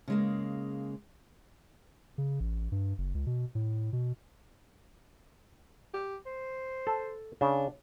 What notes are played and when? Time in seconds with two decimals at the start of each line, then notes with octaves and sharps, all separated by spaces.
0.08 C#3 G#3 A#3
2.18 C#3
2.40 A1
2.72 G2
2.98 F#1
3.15 C#2
3.26 B2
3.55 A2
3.93 B2
5.94 G4
6.26 C5
6.87 A4
7.41 C#3 D4